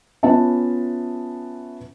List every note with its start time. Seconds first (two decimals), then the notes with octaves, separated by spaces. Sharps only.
0.23 B3 C#4 F4 E5 A5